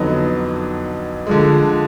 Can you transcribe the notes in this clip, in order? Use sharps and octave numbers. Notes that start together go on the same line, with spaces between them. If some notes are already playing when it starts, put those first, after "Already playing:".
Already playing: F2 D3 F#3 B3 D#4
D3 F3 G#3